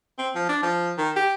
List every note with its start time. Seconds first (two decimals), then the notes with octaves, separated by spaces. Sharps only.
0.18 C4
0.35 F3
0.49 D4
0.62 F3
0.98 D#3
1.16 G4